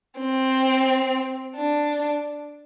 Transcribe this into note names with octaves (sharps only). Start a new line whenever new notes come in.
C4
D4